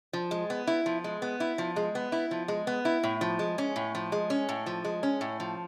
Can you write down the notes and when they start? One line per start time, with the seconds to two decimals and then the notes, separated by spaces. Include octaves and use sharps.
0.13 F3
0.31 G#3
0.50 B3
0.67 E4
0.86 F3
1.04 G#3
1.22 B3
1.40 E4
1.58 F3
1.76 G#3
1.95 B3
2.12 E4
2.31 F3
2.48 G#3
2.67 B3
2.85 E4
3.03 A2
3.21 F3
3.39 G#3
3.58 C#4
3.76 A2
3.95 F3
4.12 G#3
4.30 C#4
4.49 A2
4.66 F3
4.85 G#3
5.03 C#4
5.21 A2
5.40 F3